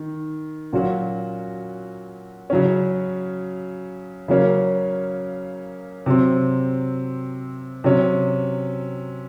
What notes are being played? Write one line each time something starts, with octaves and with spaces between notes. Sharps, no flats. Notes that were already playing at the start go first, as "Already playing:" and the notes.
Already playing: D#3
A#2 F#3 C#4 F#4
C#3 F#3 C#4
C#3 F#3 A#3 C#4
C3 F#3 C4
C3 F#3 C#4